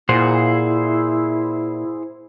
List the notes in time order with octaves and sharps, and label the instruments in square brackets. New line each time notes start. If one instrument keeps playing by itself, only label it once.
[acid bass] A#2 [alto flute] E4 [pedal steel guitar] G#4 C5 F#5